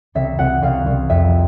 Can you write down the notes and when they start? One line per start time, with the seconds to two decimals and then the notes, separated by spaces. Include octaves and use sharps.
0.15 C2 E5
0.39 C2 F#5
0.62 C2 F5
0.86 C2
1.09 F2 E5